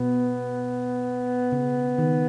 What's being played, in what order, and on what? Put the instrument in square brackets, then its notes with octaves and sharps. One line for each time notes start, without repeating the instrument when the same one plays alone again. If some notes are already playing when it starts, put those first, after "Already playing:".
Already playing: [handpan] B2 [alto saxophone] B3
[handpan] C#3
D#3